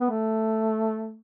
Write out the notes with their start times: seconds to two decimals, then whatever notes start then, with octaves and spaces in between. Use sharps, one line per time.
0.01 B3
0.10 A3